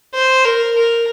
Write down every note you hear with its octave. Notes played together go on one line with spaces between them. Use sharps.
C5
A#4
A#4